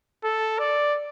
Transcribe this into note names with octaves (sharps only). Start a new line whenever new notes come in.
A4
D5